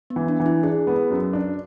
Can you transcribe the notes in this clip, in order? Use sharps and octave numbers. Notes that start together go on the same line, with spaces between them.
B3
E3
D4
E3
E4
D4 G#4
B3
F#2
D4